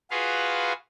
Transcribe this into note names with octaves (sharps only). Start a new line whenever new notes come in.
F4 F#4 G#4 B4 F5